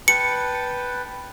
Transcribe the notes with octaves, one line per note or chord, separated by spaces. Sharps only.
B4 G5 A5 C#7